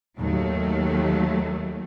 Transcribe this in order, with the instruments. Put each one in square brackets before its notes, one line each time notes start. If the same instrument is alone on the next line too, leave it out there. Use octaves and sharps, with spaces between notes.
[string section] D#2 F#3 A3